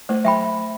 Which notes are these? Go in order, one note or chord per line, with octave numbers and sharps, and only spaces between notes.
A3 C5
F#3 E5 G5 B5